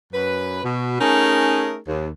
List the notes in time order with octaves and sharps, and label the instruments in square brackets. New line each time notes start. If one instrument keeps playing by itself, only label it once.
[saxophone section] F#2 B4
B2
A3 C#4 D#4 G#4 A#4
D#2